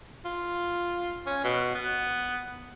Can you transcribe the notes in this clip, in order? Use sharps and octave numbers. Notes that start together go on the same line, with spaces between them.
F4
C#4
B2
B3